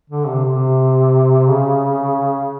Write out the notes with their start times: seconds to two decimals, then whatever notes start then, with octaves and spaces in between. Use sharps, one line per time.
0.10 D3
0.27 C3
0.45 C3
1.48 C#3